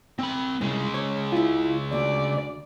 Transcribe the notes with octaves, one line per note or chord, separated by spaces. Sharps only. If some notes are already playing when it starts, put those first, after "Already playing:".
C4 B5
C2 C#3 G#3
C#5
E4 F4
D2 D5